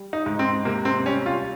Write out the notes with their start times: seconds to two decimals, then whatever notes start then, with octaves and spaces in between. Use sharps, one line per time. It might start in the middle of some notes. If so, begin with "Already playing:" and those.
Already playing: G3
0.13 D#4
0.26 G#2
0.39 C4
0.65 C3 A#3
0.85 C4
1.06 G3 C#4
1.26 F4